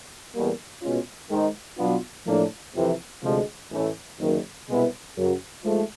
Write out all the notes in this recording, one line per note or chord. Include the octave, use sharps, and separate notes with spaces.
E2 B2 G3 A#3
B2 G#3 C#4 F4
G#2 D#3 G#3
B2 F#3 B3 D4 F4
A2 F3 A#3 D4
F2 C3 E3
D2 C3 F3 G#3
A1 A2 E3 A3 C#4
F#1 F#2 D#3
C2 B2 G#3 B3 E4
F#2 C#3 F#3
G#2 F3 A3